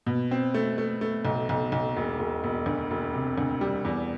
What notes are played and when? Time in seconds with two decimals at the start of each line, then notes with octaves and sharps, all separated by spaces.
0.07 B2
0.31 C4
0.54 A3
0.78 A3
1.01 A3
1.25 B1
1.49 B1
1.72 B1
1.96 E1
2.19 E1
2.44 E1
2.66 D2
2.91 E1
3.14 C3
3.38 D2
3.61 G3
3.85 E2